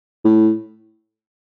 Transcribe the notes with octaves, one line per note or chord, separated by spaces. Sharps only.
A2